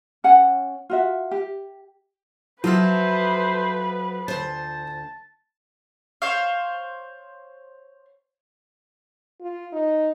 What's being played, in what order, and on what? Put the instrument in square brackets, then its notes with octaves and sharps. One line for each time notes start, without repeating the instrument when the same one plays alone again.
[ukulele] C#4 C#5 F#5 G#5
F4 F#4 E5
G4
[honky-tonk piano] F3 F4 [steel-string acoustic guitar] F#3 A4 E5 [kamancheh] B4 [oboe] C5
[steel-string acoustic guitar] D2 C5 [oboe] A5
[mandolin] C5 C#5 F5
[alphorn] F4
D#4